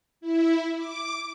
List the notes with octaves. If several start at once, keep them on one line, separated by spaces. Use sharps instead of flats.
E4
D6